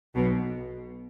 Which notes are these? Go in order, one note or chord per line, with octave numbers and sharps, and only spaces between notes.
B1 B2